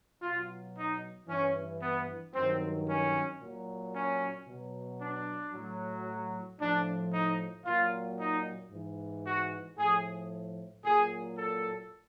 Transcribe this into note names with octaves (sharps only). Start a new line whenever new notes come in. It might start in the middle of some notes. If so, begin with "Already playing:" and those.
B2 F#3 F4
D#4
G2 E3 C#4
B3
G2 D#3 F#3 C4
C#4
A#2 F#3
C#4
B2 F#3
D4
A2 F#3
A2 F3 D4
D#4
A#2 F#3 F4
D#4
G#2 E3
F#4
A2 F3 G#4
A#2 F#3 G#4
A4